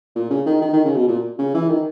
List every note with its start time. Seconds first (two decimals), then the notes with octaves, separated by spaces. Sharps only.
0.16 A#2
0.30 C#3
0.46 D#3
0.62 D#3
0.73 D#3
0.85 C#3
0.96 B2
1.08 A#2
1.39 C#3
1.54 E3
1.69 D#3